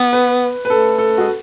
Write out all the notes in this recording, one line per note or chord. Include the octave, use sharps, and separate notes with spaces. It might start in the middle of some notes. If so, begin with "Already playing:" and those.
Already playing: B3
B4
B4
A3 A4
A4
G#3 F#4